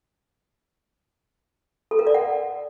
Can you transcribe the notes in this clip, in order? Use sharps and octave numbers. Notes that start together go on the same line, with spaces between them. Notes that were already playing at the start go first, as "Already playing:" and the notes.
A4
A#4
D5
F#5